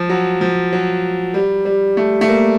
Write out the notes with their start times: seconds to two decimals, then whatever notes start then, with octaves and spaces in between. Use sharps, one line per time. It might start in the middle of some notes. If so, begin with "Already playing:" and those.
Already playing: F3
0.09 F#3
0.41 F3
0.73 F#3
1.34 G3
1.65 G3
1.97 A3
2.21 A3
2.28 A#3